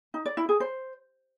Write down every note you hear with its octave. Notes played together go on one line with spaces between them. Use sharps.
D#4
D5
E4
G#4
C5